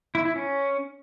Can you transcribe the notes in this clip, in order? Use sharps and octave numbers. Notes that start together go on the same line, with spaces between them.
E4
E4
C#4